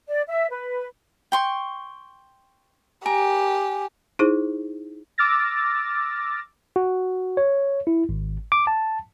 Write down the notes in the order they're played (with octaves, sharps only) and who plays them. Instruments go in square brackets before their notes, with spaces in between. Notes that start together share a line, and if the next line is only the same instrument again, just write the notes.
[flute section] D5
E5
B4
[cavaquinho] G5 C6 C#6
[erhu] G4 [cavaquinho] A#4 [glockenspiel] G#5
[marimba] D#4 E4 G#4 C5
[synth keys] D6 E6 F6 A6 A#6
[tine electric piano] F#4
C#5
E4
G#1
D6
A5